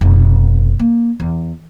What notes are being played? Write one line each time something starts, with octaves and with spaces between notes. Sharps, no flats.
F1 B2
A#3
E2